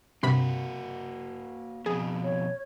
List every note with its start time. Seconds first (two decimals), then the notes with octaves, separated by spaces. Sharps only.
0.23 G2 C3 A#3 F#4 B5
1.86 F2 B2 G#4
2.24 C#5